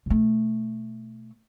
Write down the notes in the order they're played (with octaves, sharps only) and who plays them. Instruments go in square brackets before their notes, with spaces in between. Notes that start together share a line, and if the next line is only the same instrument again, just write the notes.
[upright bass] B2 A3